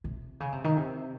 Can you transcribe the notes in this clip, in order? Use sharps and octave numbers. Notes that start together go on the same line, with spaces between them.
C3
C#3
C3
D#3
C3